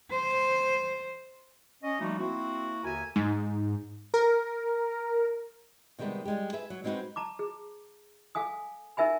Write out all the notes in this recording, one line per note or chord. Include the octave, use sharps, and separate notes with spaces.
C5
C#4 D#5
F3 G3 A3 A#3 D#4 F#4
A#3 C4 E4 F#4
D#2 D3 A#4 E5 G#5
G#2
A#4
C3 D#3 G3 G#3 B3
G3 G#3 G4
G#4 B4 E5
F#3
G#3 C4 D#4 E4 F#4 B4
A5 A#5 D6
G#4
A4 F5 G#5 D#6
D#4 A#4 E5 G#5 B5